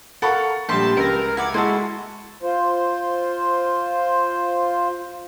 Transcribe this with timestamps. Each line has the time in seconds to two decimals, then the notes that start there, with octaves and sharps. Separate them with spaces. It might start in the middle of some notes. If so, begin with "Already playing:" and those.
0.22 A4 A#4 F5 F#5 B5 C#6
0.69 A#1 G3 C5 A5 B5 C6
0.97 C#2 A#4
1.37 E4 F#5 D6 G#6
1.54 G#3 E4 F#4 A5 C6
2.43 F4 C5